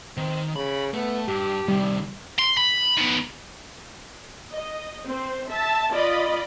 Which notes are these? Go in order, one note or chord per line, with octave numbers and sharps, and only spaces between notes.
D#3 C4
C#3 B5
A3 B3
G2 G4
C3 D#3 G3
C6
B5
D#3 B3
D#5
C4 C5
E5 A5
F4 D5 D#5 B5